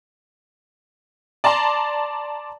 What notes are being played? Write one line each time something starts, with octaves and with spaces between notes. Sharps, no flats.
D5 A5 A#5 C6